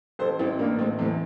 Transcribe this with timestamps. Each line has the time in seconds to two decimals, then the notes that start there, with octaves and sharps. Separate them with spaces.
0.19 A1 A4 C5
0.39 A1 C4 E4
0.59 A2 A#3 D4
0.79 A1 A3 C4
0.98 E2 A3 C4